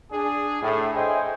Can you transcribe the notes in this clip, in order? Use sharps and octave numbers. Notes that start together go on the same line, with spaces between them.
D4 G#4
A2
G#4 C5 D#5 E5 G5 G#5